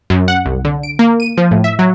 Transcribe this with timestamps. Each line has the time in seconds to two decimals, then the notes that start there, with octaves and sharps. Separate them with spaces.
0.10 F#2
0.28 F#5
0.46 C2
0.65 D3
0.83 D7
0.99 A#3
1.20 D#7
1.37 F3
1.51 A2
1.64 E5
1.79 F#3